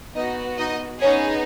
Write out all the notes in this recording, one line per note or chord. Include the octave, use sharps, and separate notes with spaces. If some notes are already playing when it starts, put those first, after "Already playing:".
B3 D#4 F#4 D#5
D#4 D#5
B3 C#4 D#4 G#4 C#5